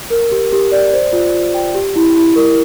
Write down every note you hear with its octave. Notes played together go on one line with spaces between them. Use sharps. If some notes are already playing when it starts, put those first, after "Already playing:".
A#4
G4
G4
D5
C5
F4
F4
G5
G4
E4
E4
A#4